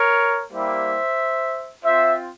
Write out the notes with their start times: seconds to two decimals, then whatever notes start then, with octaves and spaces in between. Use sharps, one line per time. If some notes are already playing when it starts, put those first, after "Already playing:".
Already playing: A#4 C#5
0.52 G3 A#3 E4 G4 C5 E5
1.84 C4 F4 C5 E5